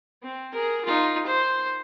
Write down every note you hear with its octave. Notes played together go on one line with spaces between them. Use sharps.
C4
G#4 A#4
D#4 F4
C5